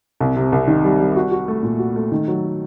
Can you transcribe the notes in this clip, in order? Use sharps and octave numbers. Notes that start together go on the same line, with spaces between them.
C2
C3
C2
D#3
G3
G3
F#4
F#4
A3
A#2
F#4
A3
D#3
F#3